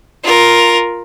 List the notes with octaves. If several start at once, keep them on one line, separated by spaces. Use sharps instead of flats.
F4 A#4